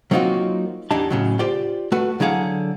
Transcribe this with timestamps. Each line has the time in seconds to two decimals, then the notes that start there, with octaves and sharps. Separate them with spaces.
0.11 F#3 A#3 C4 D#4 F4 F#4
0.91 E2 E3 D4 D#4 G4 A5
1.10 A2 C#3 F#3
1.39 F4 G4 C5 D5 G5
1.92 A3 F#4 B4
2.20 D3 F#3 E4 G#4 F5 F#5